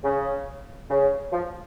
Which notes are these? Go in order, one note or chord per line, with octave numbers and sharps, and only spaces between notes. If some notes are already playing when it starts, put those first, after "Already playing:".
C#3
C#3
F3